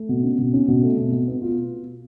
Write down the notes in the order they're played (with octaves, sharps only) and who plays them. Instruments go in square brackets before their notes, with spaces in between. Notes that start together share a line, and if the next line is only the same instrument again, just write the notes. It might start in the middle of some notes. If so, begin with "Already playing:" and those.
Already playing: [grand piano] A3
B2
C#4
B2
C#4
B2
A3
B2
B2
B3
F4